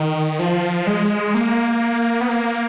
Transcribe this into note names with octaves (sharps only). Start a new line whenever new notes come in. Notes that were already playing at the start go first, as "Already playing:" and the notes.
Already playing: D#3
F3
G#3
A#3
B3
A#3